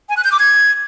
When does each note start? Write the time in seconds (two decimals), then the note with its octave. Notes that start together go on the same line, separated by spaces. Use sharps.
0.09 G#5
0.17 F#6
0.24 G6
0.32 D6
0.39 G#6